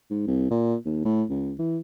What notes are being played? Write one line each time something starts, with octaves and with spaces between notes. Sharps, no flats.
G#2
C2
A#2
D#2
A2
C#2
E3